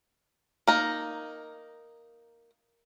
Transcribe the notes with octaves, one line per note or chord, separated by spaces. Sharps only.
A#3 D#4